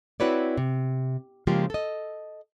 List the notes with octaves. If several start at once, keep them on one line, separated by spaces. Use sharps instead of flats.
C4 E4 F#4 B4 C#5 D5
C3
C#3 F3 G#3 A#3 F4 G4
A4 D#5